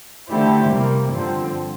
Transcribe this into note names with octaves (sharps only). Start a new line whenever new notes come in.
D3 A3 E4 G4 C5
C3 G3 A#3
G2 D3 F3 C4